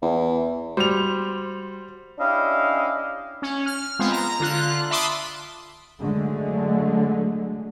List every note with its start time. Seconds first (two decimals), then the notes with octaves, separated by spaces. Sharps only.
0.02 E2
0.77 G3 F#4 C5 F7
2.19 C#4 D4 E4 G4 D#5 F5
3.42 C#4
3.66 F6
3.99 G#3 B3 C4 F4
4.12 A#5
4.40 D3 F4 F#6
4.91 E5 A5 B5 C6 D6 D#6
6.01 D3 F#3 G#3 A3